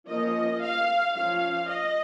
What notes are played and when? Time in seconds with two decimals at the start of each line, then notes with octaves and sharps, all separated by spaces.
0.08 F3 A#3 C#4 D#5
0.62 F5
1.16 F3 C#4 F5
1.69 D#5